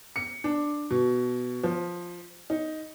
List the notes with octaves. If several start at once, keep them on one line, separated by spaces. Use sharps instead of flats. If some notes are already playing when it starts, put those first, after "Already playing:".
C#7
D4
B2
F3
D#4